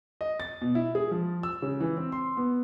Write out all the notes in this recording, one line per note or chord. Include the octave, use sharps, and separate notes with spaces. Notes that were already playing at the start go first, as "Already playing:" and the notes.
D#5
A6
B2
E4
G#4
F3
E6
C#3
E3
C4
C6
B3